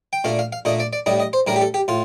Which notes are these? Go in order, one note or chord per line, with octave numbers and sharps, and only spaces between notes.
G5
A#2 A3 D4 F5
F5
F5
A#2 A3 D4 D#5
D5
D5
A2 G3 D4 D#5
D#5
C5
A2 G3 D4 A#4
G4
A4
G4
A2 F4